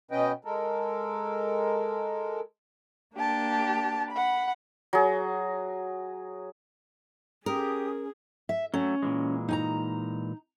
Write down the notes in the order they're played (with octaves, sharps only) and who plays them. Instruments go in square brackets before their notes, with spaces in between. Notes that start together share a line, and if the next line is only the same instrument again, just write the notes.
[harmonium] B2 C#4 B4 D#5 G5
G#3 A4 A#4
[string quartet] A#3 D4 G4 A5
F#5 B5
[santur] F#3 G#4
[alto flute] C#4 [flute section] G4 D#6 [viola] G#4 [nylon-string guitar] A#4
[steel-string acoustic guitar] E5
[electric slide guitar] F#3 A3 [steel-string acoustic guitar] C#4
[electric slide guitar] A#2 E3 G#3
[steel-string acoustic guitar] D#4 G#5 A#5